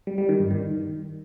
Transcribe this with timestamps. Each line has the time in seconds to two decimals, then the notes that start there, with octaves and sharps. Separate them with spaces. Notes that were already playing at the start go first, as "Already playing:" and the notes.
0.07 G3
0.18 G3
0.29 D#3
0.40 G2
0.51 D#3